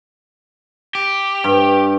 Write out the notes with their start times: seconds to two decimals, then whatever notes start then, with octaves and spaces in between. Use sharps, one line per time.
0.95 G4
1.44 G2